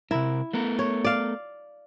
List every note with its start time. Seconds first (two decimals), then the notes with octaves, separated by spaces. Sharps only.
0.11 C3 E4 A#4
0.53 A3 B3 A#4
0.79 C#5
1.04 D5 F5